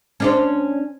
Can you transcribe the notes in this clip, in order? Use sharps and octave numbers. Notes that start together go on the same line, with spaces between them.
C#4 D4 C5